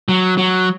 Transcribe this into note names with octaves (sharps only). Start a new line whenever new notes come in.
F#3
F#3